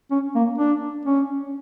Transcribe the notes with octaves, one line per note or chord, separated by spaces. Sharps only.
C#4
A#3
D4
C#4